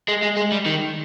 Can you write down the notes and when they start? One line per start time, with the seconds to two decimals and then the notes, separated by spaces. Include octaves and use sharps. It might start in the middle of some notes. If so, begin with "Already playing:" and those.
0.08 G#3
0.23 G#3
0.37 G#3
0.52 G3
0.66 D#3